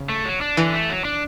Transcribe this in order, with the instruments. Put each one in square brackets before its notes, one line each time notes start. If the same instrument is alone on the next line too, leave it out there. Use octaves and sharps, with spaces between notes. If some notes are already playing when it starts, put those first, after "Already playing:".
Already playing: [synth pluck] C#3
[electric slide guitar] A3
F#3
D4
[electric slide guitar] D3 [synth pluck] E3
[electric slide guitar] A3
F#3
D4